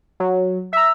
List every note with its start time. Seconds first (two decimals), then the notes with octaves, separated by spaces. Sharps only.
0.20 F#3
0.73 E5 A#5 E6